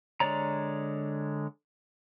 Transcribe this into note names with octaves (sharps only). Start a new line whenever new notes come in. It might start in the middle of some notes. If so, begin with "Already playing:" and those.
D3 G#3 C#5 D5 A#5